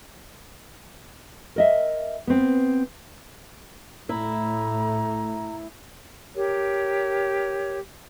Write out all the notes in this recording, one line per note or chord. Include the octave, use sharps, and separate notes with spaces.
A#4 D#5 E5
B3 C4
A2 A3 E4 A#5
G4 A#4 C#5